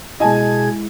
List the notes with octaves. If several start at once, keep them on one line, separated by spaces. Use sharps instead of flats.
B2 G#3 E4 G#4 D#5 G#5 A5 G#6